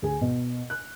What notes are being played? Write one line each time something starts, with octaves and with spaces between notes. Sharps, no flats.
D2 G#4 G#5
B2
F#6